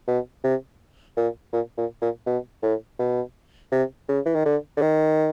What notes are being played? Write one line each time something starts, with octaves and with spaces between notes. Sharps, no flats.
B2
C3
A#2
A#2
A#2
A#2
B2
A2
B2
C3
C#3
E3
D#3
D3
D3
D#3